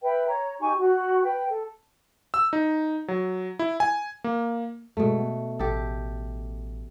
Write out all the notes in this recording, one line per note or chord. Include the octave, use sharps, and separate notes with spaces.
B4 E5 G5
C#5 A#5
D#4 G4 G#5 C#6
F#4
B4 G5
A4
E6
D#4
F#3
E4
G#5
A#3
G2 B2 G#3 A3
B3
A1 G4 A4